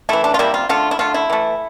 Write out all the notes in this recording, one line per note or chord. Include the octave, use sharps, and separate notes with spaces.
E3 A3 E4
D4
F4
C3 G3 A#3 E4
F4
D3 A3 F4
E4
D3 A3 F4
E4
E3 A3